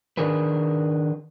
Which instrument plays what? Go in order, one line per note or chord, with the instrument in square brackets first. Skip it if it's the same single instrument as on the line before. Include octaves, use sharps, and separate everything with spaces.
[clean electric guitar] D#3 D4 G#4 A#4 B4